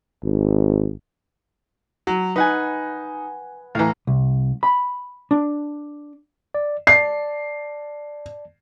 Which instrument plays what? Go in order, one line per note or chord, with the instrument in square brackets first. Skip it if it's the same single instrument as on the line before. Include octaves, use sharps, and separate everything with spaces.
[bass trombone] G#1
[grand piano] F#3
[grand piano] D#4 [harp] B4 F#5 G#5
[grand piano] A2 E3 [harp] F5 A#5
[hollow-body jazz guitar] C2
B5
D4
[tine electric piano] D5
[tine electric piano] D5 A5 [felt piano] C7